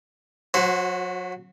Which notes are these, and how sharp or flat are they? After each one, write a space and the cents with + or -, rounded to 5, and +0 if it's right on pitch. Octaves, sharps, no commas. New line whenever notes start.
F#3 -30 F#4 +0 C5 +5